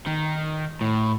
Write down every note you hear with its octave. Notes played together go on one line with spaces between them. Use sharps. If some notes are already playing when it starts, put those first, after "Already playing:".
D#3
A2